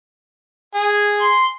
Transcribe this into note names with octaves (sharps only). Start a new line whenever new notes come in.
G#4
C6